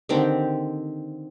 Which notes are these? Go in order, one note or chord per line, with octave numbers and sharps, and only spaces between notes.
D3 D#3 C4 G4